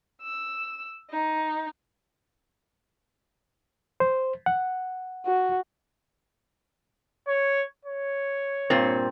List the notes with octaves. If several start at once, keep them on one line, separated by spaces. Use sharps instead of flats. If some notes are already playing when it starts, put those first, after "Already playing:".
E6
D#4
C5
F#5
F#4
C#5
C#5
G2 A#2 C4